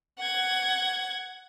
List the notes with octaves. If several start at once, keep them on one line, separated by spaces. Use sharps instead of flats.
F#5 G#6